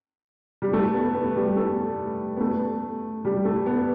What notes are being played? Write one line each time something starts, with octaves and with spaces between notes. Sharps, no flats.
G3
A3
B3
B3
G3
A3
B3
A3
G3
A3
B3